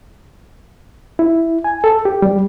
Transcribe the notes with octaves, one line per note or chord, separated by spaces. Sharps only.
E4
G#5
A4
G4
G3